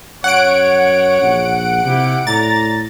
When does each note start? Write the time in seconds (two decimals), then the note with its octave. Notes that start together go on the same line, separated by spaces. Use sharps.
0.24 F#2 C#5 F#5 D7
1.22 A#1
1.85 C3 E4 F4 G4
2.27 A2 D5 A#5 A6